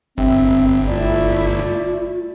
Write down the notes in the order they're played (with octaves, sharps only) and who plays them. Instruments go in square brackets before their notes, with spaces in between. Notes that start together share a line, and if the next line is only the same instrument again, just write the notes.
[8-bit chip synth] G1 [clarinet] C4 [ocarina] E5
[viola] A3 E4 [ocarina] F4 [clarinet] D5